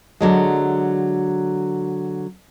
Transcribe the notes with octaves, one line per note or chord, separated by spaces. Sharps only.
D3 F#3 G#3